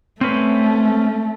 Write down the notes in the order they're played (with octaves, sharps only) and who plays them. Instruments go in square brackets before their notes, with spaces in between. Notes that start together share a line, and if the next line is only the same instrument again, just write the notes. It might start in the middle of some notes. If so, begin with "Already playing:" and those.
[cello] A3 [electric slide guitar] C4 C#4 B4